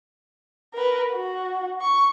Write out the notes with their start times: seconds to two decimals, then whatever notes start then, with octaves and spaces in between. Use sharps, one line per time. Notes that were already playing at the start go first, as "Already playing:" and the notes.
0.74 A#4 B4
1.13 F#4
1.82 C#6